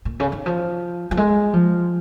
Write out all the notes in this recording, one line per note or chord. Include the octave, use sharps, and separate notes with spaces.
A#2
C#3
D#3
F3
F3
G#3
F3